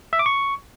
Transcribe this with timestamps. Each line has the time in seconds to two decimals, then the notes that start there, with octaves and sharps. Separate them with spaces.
0.13 E5
0.19 D6
0.26 C#6